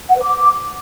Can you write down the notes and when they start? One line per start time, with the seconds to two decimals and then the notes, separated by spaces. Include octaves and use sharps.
0.09 F#5
0.16 B4
0.23 D6